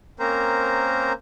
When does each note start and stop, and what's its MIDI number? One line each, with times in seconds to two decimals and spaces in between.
0.20 1.13 58
0.20 1.13 60
0.20 1.13 61
0.20 1.13 70
0.20 1.13 72
0.20 1.13 82